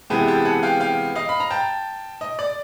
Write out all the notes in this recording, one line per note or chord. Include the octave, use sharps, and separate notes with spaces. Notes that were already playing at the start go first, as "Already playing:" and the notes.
C3 E3 G#3 B3 E4 G5 A5
G5 A5
F#5 G#5
F5 G5
F5 G5
D#5 F5
B5
A#5
G5 A5
D#5
D5